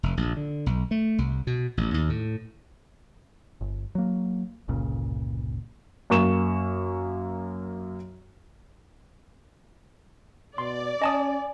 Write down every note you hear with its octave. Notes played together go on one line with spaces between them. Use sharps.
F1
A#1
D3
B1
A3
C2
B2
A1
D#2
A2
G1
F#3 A#3
G1 C#2 A#2 C#3
F#2 A#3 C#6 E7
B2 D5 C6
C#4 D#5 G#5 A5 D#6